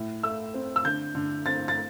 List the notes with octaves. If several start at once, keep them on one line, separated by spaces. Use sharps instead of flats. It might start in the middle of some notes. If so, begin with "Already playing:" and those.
Already playing: A2
A3 E6
C4
E6
D3 G6
D3
C4 A6
A6